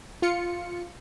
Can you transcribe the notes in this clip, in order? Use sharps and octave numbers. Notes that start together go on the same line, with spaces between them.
F4 C#7